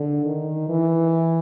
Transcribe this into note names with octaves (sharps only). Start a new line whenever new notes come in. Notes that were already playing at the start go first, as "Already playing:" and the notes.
Already playing: D3
D#3
E3